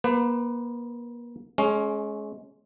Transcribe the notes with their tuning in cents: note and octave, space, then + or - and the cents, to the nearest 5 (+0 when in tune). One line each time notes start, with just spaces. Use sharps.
A#3 +35 B4 +25
G#3 +25 C#4 +0